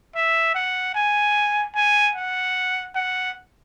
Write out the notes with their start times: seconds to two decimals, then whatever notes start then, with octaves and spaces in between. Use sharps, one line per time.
0.15 E5
0.55 F#5
0.95 G#5
1.75 G#5
2.15 F#5
2.95 F#5